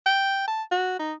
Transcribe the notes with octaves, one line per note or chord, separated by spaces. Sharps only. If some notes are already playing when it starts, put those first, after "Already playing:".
G5
A5
F#4
D#4